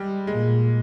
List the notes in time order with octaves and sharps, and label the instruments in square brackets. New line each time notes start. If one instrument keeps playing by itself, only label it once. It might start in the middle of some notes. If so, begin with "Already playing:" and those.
Already playing: [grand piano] G3 G#3
[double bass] A#2 [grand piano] G#3